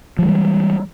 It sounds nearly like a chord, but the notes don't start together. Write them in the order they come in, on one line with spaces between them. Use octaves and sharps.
F3 G#3 E3 G3